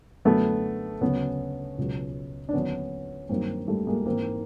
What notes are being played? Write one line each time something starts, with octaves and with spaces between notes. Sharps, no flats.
F#2 D3 F#3 A3 B3
D2 C#3 F#3 B3 C#4
C#2 B2 F#3
D4
D#2 D3 F#3 B3 C#4
G2 D#3 F#3 A#3 C4
G3 A3
G#3 A#3
G#2 E3 A#3 C4